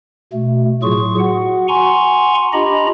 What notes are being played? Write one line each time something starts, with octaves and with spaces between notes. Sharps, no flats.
B2 A3
A2 F#3 F4 G#4 C#6
F#4 F#5
F#5 G#5 A#5 C6 C#6
D4 F4 G4 D#5 A#5 B5